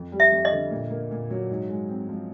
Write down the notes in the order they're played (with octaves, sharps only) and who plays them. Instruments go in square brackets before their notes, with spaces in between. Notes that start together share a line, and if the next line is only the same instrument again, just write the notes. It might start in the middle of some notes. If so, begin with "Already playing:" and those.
Already playing: [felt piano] F2
G3
[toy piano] E5
[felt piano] F2
[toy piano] D#5
[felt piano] D3
A#2
A#3
A#2
F#3
G#2
G#3
C4
F3